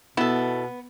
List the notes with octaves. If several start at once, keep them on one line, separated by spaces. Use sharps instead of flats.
B2 B3 E4 A4